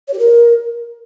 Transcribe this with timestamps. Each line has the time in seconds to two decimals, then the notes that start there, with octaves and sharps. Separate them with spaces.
0.08 C#5
0.13 G4
0.19 A#4